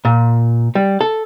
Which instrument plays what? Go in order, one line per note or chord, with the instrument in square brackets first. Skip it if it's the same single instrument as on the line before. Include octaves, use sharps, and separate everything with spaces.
[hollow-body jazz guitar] A#2
G3
A4